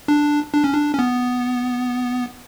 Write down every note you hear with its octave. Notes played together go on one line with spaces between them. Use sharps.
D4
D4
C#4
D4
C#4
B3